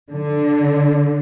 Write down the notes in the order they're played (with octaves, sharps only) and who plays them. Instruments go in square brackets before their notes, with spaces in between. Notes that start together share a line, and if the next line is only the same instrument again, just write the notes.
[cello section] D3